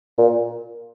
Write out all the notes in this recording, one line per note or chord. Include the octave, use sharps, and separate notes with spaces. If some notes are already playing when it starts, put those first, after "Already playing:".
A#2